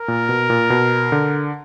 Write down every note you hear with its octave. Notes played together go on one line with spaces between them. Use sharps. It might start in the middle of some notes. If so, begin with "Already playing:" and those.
Already playing: A#4
A#2
B2
A#2
B2
D3